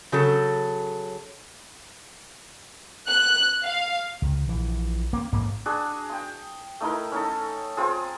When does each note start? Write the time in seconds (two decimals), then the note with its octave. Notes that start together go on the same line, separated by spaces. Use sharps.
0.12 C#3 F#3 A4
3.09 F#6
3.65 F5
4.22 C#2
4.48 A#1 E3
5.13 A#3 C4
5.32 A1 G#2 A#3
5.66 D4 F#4 G#4
6.10 G5 D#6
6.80 A3 D#4 E4 A#4
7.12 C#4 D#4 A4
7.77 C4 F4 G#4